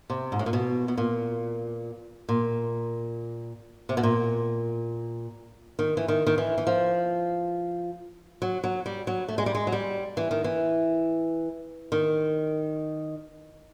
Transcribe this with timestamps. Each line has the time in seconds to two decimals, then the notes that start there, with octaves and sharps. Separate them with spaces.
0.10 C3
0.32 G#2
0.39 A2
0.46 A#2
0.53 B2
0.88 B2
0.98 A#2
2.29 A#2
3.89 C3
3.97 B2
4.03 A#2
5.79 D#3
5.97 E3
6.08 D#3
6.27 D#3
6.38 E3
6.58 E3
6.67 F3
8.42 F#3
8.64 F#3
8.86 G3
9.07 F#3
9.28 A3
9.38 G#3
9.46 G3
9.55 G#3
9.67 F#3
9.72 G3
10.17 E3
10.31 D#3
10.44 E3
11.92 D#3